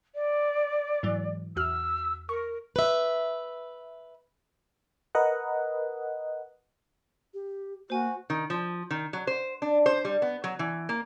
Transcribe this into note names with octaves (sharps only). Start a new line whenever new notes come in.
D5
G#2 E3 F#3
E2 F#4 E6 F6
A#4 C#6
B4 E5
A#4 B4 D#5 F#5
G4
A#3 F#4 C5 G#5
D#3
F3
D#3
F#3
C5
D4
C5
G3
B3
F#3
E3
A#3